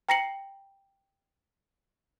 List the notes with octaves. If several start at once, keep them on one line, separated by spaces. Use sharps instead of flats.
G5 A#5 A#6 C7 C#7 F#7